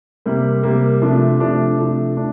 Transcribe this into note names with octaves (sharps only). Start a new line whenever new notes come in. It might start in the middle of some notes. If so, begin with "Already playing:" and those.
C3 G3 A#3
C3 G3 A#3
C3 F3 A3 D4
C3 F3 A3 D4
C3 F3 A3 D4
A3 D4